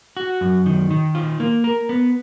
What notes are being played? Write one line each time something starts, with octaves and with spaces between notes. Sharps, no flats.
F#4
F#2
D#3
D#3
F4
A#3
A#4
B3